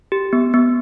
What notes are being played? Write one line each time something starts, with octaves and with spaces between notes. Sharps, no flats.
G4
B3
B3